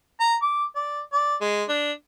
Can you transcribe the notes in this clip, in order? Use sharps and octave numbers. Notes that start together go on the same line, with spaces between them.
A#5
D6
D5
D5
G#3
D4